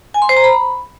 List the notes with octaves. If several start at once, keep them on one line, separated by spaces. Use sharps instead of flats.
G#5
C6
C5
A#5
B5